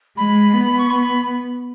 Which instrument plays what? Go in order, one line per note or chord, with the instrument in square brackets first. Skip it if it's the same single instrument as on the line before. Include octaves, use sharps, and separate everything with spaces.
[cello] G#3 [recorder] B5
[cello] B3
[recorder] C#6
B5